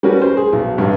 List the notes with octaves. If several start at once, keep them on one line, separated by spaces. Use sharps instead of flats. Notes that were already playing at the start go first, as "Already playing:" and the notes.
G3 C#4 F#4 A#4 B4
C5
G#4
B1
A1 G2